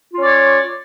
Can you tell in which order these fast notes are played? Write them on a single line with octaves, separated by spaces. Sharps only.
F4 C#4 D5 C#5